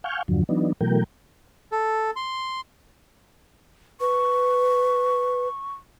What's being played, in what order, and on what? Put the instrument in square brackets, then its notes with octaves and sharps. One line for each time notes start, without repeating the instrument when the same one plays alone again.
[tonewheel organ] F5 F#5 G#5 C#6 F6 G6
E2 G2 D3 F3 F#3
E3 F#3 B3 D4 D#4
B2 E3 F#3 A3 A#4 G5
[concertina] A4
C6
[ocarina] B4 [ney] C#6